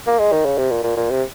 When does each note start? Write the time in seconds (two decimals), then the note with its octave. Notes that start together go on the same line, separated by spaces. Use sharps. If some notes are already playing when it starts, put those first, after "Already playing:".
0.07 A#3
0.19 G#3
0.32 D#3
0.45 C#3
0.58 C3
0.71 A#2
0.84 A#2
0.97 A#2
1.10 C3